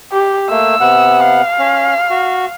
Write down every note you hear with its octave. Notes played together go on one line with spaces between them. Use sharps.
G4
A3 A#3 E6
C3 B3 F#5
F5
C#4
F#4